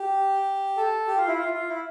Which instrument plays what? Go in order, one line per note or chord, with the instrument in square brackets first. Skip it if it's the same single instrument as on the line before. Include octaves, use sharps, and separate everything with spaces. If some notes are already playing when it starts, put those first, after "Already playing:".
Already playing: [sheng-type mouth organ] G4
A4
G4
F4
E4
F4
F4
E4